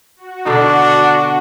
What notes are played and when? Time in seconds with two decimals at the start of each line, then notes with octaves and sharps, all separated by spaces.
0.17 F#4
0.46 B2 D3 D4 A4